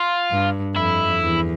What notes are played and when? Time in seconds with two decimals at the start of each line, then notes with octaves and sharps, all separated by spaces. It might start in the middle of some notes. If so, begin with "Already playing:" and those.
Already playing: F4
0.31 G2
0.76 F2 E4
1.21 E2